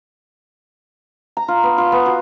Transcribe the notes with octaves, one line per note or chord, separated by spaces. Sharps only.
A#5
F4
B3
F4
B3
F#4